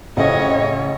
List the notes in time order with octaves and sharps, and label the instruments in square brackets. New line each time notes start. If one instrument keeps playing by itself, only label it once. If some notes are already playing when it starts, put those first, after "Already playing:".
[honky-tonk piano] A1 C#3 E4 [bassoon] F2 [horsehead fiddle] C#4 C#5 [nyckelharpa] D#5